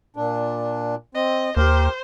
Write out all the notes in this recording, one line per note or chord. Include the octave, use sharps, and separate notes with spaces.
A#2 D4
C4 D#5
D#2 G4 A#4 C5